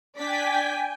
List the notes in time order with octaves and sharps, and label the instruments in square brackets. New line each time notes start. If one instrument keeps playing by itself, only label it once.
[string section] D4 D5 B6 [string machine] G5 G#5